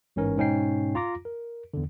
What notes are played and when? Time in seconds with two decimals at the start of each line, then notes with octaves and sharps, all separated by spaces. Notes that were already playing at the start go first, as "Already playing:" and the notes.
0.16 A1 G#2 E3 C#4 A#4
0.37 G#2 B2 C#4 D#4 G5 C7
0.95 F4 A#5 D6 A#6
1.25 A#4
1.74 E2 D3